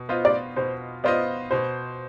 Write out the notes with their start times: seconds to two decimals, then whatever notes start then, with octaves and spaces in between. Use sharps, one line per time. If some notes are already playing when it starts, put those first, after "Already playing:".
Already playing: B2
0.09 B3 F4 C5 D#5
0.25 D5
0.56 B2 C5
1.04 B3 F4 C5 D5 D#5
1.51 B2 C5